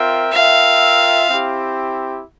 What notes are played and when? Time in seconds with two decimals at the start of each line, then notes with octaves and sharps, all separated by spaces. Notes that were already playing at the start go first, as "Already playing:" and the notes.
Already playing: C4 F4 A#4 E5 G5
0.32 F4 A#4 E5 F5 G5
1.29 C4 E4 G4